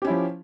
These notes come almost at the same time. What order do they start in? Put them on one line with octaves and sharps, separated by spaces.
G4 C#4 E4 F3